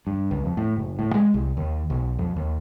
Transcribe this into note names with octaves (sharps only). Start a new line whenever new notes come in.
G2
C#2
F2
A2
F#1
A2
G#3
C2
D#2
B1
F2
D#2